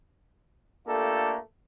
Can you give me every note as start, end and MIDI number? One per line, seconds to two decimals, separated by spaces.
0.87 1.37 57
0.87 1.37 58
0.87 1.37 62
0.87 1.37 65
0.87 1.37 67
0.87 1.37 69